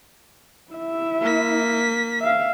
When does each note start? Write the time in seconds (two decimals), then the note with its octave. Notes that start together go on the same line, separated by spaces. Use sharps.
0.72 E4 E5
1.21 A#3 B6
2.20 E5 F5